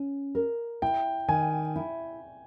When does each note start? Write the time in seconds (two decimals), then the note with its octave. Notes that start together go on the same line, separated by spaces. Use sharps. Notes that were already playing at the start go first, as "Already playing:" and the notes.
Already playing: C#4
0.35 A#4
0.82 E4 G5
1.28 D#3 G#5
1.76 E4